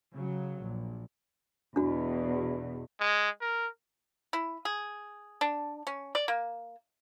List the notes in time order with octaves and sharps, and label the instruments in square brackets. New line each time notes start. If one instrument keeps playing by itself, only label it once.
[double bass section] C#3 F#3
A#1
[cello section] E2 B2 [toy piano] D4 F#4
[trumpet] G#3
A#4
[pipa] E4
G#4
D4
C#4
D5
A#3